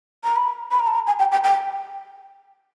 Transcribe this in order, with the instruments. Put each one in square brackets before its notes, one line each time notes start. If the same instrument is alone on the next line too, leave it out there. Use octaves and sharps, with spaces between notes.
[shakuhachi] A#5
B5
B5
A#5
A5
A#5
G#5
G5
G5
G5